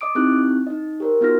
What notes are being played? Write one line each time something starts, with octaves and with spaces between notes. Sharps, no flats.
D#5 D6 D#6 D7
C4 D#4 E4 G4 F#6
D#4 D#5
G4 A#4 C5
B3 D#4 F4 F#4 F6 A#6